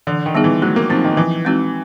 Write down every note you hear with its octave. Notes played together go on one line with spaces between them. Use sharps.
D3 E3
D#3
G3 B3 D#4 G#4
E3
F#3 A3
A#3
F3 C4 D#4
D#3
E3 F3
G#3 C4 D#4 F#4